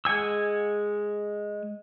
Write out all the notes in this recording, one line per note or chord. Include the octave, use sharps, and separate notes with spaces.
G#3 F#5 G#5 E6